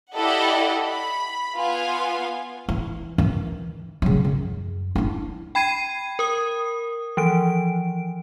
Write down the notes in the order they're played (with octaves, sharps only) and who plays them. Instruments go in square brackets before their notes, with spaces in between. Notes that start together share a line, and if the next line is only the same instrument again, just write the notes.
[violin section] E4 G4 A4 D5 D#5 F#5
B5
B3 F4 G#5
[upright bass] E3
D#3 E3
C#3 F#3
F#2
D4 E4
[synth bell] G5 B5 G#6 C7 D#7
A#4 D#6
E3 F3 D7